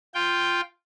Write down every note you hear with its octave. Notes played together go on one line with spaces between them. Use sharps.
F4 G5